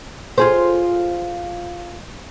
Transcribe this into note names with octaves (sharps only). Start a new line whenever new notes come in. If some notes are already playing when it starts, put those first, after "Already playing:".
F4 G#4 C5